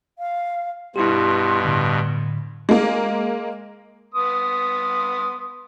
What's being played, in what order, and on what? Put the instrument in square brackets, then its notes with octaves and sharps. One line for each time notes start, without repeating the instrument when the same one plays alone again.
[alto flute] F5
[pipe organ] G2 B2 [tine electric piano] E4 G4 [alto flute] C6
[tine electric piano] A2 D3
[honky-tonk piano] G#3 A#3
[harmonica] B3 C6 D#6